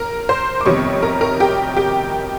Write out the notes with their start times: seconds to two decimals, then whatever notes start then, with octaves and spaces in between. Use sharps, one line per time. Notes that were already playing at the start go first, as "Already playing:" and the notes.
Already playing: A#4 A#5
0.29 C5 C6
0.61 D6
0.66 F2 C3 D#3 G3 B3 C#5 C#6
1.02 A#4 A#5
1.21 A#4 A#5
1.40 G4 G5
1.76 G4 G5